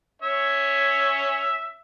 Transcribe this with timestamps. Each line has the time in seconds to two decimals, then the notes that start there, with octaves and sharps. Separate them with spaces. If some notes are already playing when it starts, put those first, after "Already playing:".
0.22 C#4 C#5 E5